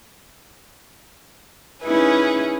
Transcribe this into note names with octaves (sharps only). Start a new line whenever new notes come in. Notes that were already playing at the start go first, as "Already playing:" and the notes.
C#4 D#4 E4 G#4 B4